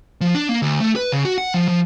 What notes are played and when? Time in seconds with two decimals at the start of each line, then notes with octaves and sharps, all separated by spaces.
0.21 F3
0.35 D4
0.49 A#3
0.62 D2
0.80 A3
0.96 B4
1.12 C#3
1.25 F#4
1.38 F#5
1.54 F3
1.68 F3